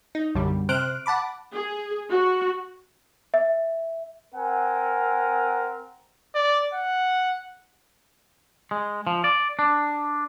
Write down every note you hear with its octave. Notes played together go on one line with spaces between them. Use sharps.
D#4
B1 F#2 D3 G3
C3 C5 F6 F#6 D7
F#5 A5 B5 D6
G#4
F#4
E5
C4 A#4 F#5 G#5
D5
F#5
G#3
F3
D5
D4